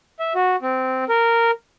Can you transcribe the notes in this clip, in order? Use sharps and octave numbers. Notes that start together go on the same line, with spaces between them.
E5
F#4
C4
A#4